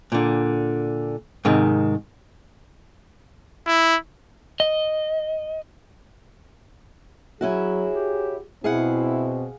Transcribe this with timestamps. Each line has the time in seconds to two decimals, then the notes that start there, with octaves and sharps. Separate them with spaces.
0.12 A#2 D3
1.45 G#2 C3 D#3
3.67 E4
4.60 D#5
7.41 F#3 C#4 E4 F#4 G#4
7.94 G4
8.64 B2 C4 E4 G#4 F5 F#5